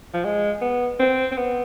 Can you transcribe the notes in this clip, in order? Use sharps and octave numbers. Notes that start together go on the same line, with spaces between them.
F3
G#3
B3
C4
C4
B3